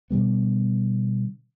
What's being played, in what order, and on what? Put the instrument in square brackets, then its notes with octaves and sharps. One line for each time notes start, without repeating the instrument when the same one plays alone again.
[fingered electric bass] B2 D3 G3 B3